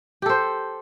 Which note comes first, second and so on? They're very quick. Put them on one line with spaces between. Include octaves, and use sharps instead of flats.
G4 A4 C5